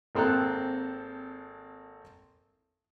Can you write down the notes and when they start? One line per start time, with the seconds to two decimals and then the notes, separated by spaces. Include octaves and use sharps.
0.15 G#1 A#3 C4 A4 A#5 F#6